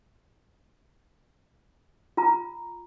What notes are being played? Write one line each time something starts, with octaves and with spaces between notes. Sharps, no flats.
F4 A#5